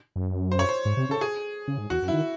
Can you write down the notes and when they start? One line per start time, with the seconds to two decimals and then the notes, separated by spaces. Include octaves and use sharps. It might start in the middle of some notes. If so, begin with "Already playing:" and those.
0.16 F#2
0.52 C5
0.59 C#5
0.69 C5
0.85 G#2
0.97 C3
1.09 C#3 A4
1.21 G#4
1.68 C#3
1.78 G#2
1.90 E2 F#4
2.02 F#2
2.08 E4
2.13 D#3